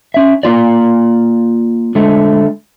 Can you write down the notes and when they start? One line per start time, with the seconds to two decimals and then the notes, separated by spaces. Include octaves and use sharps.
0.14 C#4 E5
0.43 A#3 F4 D5
1.95 D3 G#3 A3